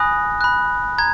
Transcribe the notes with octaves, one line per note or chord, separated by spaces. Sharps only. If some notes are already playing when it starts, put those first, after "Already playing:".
Already playing: G#5 B5 D#6 F#6 A#6
B5 F#6
A#5 G#6